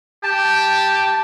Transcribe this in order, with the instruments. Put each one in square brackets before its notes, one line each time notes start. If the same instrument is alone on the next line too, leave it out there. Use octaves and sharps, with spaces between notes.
[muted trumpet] G4 [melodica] A5